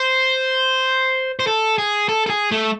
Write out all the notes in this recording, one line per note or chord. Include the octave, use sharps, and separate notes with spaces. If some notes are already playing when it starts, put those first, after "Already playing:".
Already playing: C5
C5
A4
G#4
A4
A4
G#4
A3